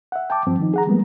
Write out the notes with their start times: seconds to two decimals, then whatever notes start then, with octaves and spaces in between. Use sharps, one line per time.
0.12 E5 F#5
0.30 G5 A5 D6
0.47 G2 F3 C4
0.58 D#3 F3 D#4
0.74 G#4 F#5 A#5
0.86 F3 G3 G#3 A#3 B3